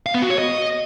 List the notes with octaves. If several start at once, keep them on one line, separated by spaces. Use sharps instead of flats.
F5
B3
F#4
C#5
D#5